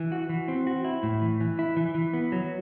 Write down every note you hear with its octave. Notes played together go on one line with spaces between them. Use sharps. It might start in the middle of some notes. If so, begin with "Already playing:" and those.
Already playing: E3
F#4
E3
C4
F#4
E4
A2
E3
E3
E4
E3
E3
B3
F#3